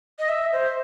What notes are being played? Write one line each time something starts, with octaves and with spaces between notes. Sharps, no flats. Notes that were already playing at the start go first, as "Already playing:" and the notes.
D#5
E5
C5